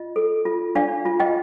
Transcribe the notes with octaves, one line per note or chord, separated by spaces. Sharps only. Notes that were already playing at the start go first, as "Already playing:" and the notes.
Already playing: F4 D#5
A4
F4
D4 D5 F5
F4
D#5 G5